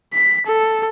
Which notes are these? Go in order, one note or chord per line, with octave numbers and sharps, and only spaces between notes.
B6
A4